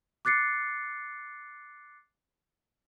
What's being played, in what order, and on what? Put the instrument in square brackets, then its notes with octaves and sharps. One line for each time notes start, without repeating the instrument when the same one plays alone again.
[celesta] D6 F#6 A6 C7 C#7